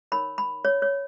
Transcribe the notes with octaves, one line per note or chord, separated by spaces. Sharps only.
D#4 A#4 C#5 B5
B5
C#5
C#5